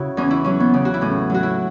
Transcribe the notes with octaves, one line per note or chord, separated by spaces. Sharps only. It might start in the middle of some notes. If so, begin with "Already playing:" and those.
Already playing: C#3 E4 F#4
E2 C#4
E4
F#3 C#4
B3
C#3
F#4
E4
A2 C#4
F#3 F#4
E4